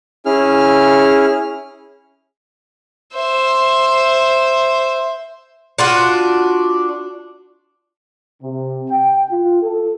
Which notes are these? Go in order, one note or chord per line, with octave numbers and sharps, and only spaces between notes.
C#4 E4 G#4 F6
C5 E5
D4 F4 F#4
C3
G5
F4
A4